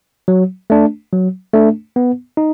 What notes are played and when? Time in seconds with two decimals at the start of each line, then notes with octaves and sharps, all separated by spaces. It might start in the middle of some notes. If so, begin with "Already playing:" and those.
0.28 F#3
0.70 A3 D4
1.13 F#3
1.53 A3 D4
1.96 B3
2.37 D#4